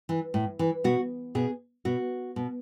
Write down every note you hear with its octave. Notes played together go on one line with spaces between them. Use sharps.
E3
A2
E3
B2 F#4
B2 G#4
B2 F#4
B2